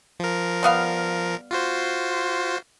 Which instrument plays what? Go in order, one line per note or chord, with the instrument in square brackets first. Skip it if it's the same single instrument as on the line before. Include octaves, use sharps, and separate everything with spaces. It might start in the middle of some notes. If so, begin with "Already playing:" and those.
[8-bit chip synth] F3 A#4
[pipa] G3 B3 F5
[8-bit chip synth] F4 F#4 C5